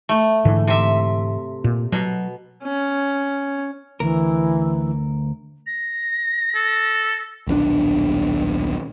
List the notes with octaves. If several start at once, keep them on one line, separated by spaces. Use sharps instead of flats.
A3
G#2 D3 E3
C3 E5
A#2
B2 F#3
C#4
D2 E3 A#4
A#6
A4
D#1 B1 C#4 D4